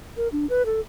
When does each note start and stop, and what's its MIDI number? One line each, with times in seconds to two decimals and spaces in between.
0.17 0.28 70
0.32 0.46 62
0.50 0.65 71
0.66 0.80 69